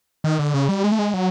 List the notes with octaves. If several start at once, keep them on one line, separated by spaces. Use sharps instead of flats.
D#3
D3
C#3
G3
G#3
A3
G#3
F#3